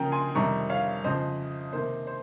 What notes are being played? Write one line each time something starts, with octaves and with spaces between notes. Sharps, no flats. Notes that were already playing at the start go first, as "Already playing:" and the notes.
Already playing: C#3 F3 A#3 C#4 G5 A#5
G#5 C6
F2 C3 D#3 G3 A#5 C#6
C#5 F5
F2 C#3 F3 C5 D#5
C3 D#3 A#3 C5
C5